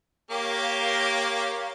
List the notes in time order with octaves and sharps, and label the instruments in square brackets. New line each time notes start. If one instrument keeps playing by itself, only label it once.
[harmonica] A#3 G4 [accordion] A#4 C#5 F5